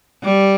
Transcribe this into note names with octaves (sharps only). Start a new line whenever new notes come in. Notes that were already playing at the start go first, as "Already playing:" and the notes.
G3